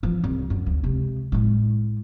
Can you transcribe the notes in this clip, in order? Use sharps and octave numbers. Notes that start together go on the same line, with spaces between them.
E3 F3
C2
F#2
D2
C3 G#3
A2 G#3